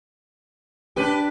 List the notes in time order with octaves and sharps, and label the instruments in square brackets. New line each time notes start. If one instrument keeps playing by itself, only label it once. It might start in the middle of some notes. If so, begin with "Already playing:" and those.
[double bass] D4 [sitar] G4 B4